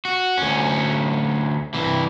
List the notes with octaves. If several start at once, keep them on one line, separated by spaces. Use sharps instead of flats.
F#4
D2 C#4
C2 E3